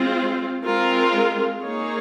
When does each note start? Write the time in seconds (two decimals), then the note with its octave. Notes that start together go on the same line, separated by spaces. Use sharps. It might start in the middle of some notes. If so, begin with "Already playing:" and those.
Already playing: G#3 C4 F4
0.64 G#3 C4 F4 A#4
1.60 A#3 D#4 G#4 C#5